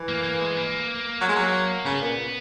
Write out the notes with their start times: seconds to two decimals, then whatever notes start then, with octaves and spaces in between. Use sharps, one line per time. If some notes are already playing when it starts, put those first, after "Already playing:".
Already playing: E3
0.08 A#3
0.24 A#3
0.40 G#3
0.57 A#3
1.21 F#3
1.29 G#3
1.36 F#3
1.85 C#3 B3
2.01 A#2